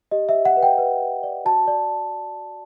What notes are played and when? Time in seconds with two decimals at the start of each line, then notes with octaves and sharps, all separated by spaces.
0.11 G4 D#5
0.29 E5
0.35 G4
0.45 F#5
0.57 B4
0.63 G5
0.78 B4
1.01 B4
1.23 D5
1.45 F#4 A5
1.68 D5